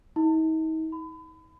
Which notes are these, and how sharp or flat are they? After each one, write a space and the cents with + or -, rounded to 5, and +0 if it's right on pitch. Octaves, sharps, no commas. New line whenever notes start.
D#4 +40
B5 +35